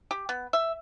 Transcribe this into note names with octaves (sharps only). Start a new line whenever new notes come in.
G4
B3
E5